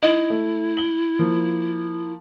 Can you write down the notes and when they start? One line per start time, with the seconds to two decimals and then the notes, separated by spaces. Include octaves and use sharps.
0.02 D#4 E4 D#5
0.30 A3
0.77 F#7 G7
1.19 F3 A#3